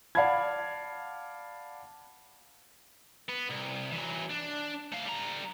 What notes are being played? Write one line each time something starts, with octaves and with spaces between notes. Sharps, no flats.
D5 F5 F#5 A5 B5 G#6
B3
C2
E3 F#3
D4
A3 F5
G3 A#5